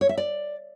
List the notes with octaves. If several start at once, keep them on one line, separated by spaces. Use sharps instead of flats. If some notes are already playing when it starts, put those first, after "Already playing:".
C#5
E5
D5